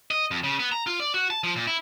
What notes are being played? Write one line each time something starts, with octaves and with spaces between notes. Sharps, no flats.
D#5
F2
C#3
B3
A#5
F4
D5
F#4
A5
F3
A#2
E4